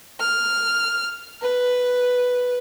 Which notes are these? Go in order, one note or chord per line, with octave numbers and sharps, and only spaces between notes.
F6
B4